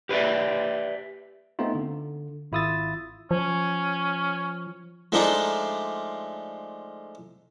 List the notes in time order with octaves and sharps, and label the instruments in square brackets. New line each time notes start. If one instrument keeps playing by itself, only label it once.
[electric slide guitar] G4 B4 C5 D5 E5
[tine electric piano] A3 B3 C4 D#4 F4
D3
G#1 E4 F4 D#6 E6 A6
[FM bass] F3 [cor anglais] C#4
[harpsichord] F3 G#3 A3 D4 D#4 F4